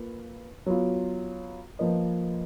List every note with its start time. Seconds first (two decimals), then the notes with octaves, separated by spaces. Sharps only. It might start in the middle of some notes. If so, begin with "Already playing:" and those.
Already playing: A#3 F4 B4
0.66 F#3 B3 F4
1.79 F3 A#3 F4 B4 D#5